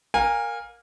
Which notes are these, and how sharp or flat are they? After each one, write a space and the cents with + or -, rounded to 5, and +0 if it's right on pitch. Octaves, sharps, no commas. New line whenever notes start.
A#4 +0 F5 +30 G#5 -25